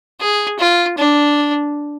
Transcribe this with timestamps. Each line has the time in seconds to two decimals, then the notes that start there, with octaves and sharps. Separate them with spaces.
0.20 G#4
0.59 F4
0.98 D4